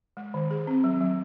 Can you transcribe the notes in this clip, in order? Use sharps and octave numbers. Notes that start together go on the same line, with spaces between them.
G#3
D#3
G#4
C4
F#3
F#3